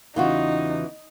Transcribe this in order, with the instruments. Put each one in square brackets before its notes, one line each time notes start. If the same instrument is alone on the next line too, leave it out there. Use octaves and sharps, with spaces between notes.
[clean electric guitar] E2 C#3 [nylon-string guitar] E3 F4 F#4 [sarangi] D#4